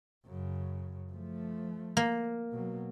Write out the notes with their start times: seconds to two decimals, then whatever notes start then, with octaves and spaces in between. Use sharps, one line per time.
0.26 F#2 C#3
1.11 F3 A3
1.97 A#3
2.52 B2 F#3